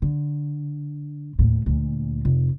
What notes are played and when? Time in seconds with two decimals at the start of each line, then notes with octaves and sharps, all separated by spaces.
0.02 D3
1.39 D#2 A2
1.66 D2 A#2
2.25 F1